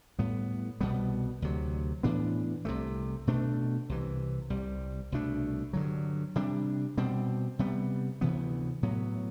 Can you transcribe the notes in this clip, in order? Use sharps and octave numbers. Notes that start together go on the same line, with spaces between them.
A2 G3 B3
C2 B2 G3 B3
D2 C3 F#3
A2 E3 B3 D4
C2 C3 E3 A3
B2 A3 D4
C2 C3 E3
C2 C3 G3
C2 B2 A3 D4
G2 D3 F#3
C3 G3 D4
B2 G3 C4
C3 G3 B3
D2 C3 E3 B3
A2 F#3 B3